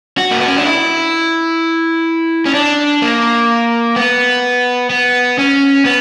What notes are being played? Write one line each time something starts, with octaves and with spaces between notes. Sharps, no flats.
F#4
A#3
B3
C#4
D4
E4
C#4
D4
A#3
B3
B3
C#4
B3